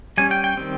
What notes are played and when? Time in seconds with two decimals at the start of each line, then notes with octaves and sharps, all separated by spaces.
0.17 G3 C#4 G#5
0.31 G5
0.44 G5
0.57 D#3 G3 C4